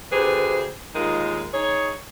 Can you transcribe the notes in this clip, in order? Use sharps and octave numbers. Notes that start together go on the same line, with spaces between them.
D2 G4 G#4 B4 C5
D#2 G#3 D#4 F4 A#4
D#4 G#4 C#5